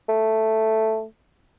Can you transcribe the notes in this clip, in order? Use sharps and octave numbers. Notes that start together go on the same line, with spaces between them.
A3